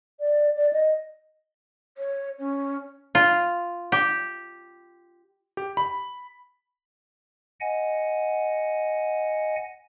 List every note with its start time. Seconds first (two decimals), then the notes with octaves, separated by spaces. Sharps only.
0.20 D5
0.56 D5
0.73 D#5
1.98 C#5
2.39 C#4
3.15 F4
3.92 G4
5.57 G4
5.77 B5
7.60 D#5 F#5 G#5